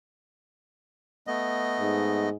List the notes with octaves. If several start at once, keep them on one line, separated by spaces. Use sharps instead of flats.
A3 B3 D#5
G#2